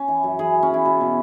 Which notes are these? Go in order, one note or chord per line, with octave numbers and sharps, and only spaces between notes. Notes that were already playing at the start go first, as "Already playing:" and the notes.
Already playing: C#4
E3
F#2
E3 G#4
E3
C#4
B3 E4
B2
B2